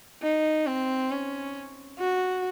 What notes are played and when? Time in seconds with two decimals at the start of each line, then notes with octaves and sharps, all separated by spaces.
0.22 D#4
0.66 C4
1.11 C#4
1.99 F#4